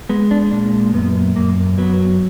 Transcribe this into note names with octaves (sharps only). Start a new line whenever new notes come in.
G#3 B3
D4
A#2 D4
F#2 B3
F#2 A#3
F#3 B3